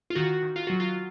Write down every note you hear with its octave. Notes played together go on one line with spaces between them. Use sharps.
F4
D#3 F#4
D#3
F4
F#3 F#4
F4